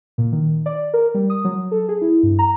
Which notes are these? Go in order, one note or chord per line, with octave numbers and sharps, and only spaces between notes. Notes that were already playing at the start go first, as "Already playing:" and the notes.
A#2
D#3
D5
A#4
G3
D#6
F#3
A4
G#4
E4
G2
A#5